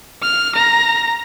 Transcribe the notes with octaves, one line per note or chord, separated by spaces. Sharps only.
F6
A#5